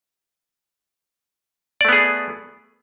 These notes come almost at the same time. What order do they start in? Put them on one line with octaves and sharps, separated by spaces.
D5 A3 B3 G#4